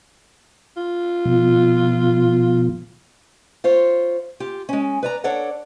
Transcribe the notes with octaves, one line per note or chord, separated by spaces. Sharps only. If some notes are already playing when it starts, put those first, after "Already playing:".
F4
B2 F3
F4 C5 C#5
F4 G4
G#3 C#4
B4 D5 A#5
D4 A4 C#5 D5 F#5